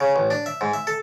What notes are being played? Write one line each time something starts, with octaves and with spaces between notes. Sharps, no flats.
C#3
A1
D4
E5
G#2
E5
A4